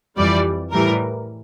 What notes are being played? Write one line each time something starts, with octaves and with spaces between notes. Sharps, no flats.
F2 E3 G3 D5
A2 E3 G3 A#4